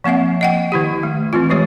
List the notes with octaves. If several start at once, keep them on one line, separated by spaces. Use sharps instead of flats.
F3 A#3 C4 E5 F#5
D#5 F#5 G5
D#3 E4 G4
A3
E3 A3 C4 F4
E3 F3 G#3 G4 C#5